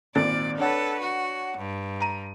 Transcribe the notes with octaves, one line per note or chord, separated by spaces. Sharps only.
G#1 A#2 D5 A6
D4 A4 B4 C#5 F#5
F#4
G2
A#5 D#7